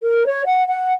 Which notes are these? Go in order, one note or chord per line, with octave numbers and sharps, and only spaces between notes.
A#4
C#5
F#5
F#5